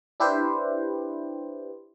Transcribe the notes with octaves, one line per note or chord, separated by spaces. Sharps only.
D4 E4 G4 B4 C5